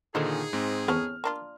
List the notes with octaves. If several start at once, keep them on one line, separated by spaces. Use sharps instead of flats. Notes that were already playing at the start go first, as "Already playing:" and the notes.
A#2 D3 D#3 D#4 G#4 A4 C5 D#5
G#2 C4
E2 C4 C#4 A4 F6
A#3 D4 F4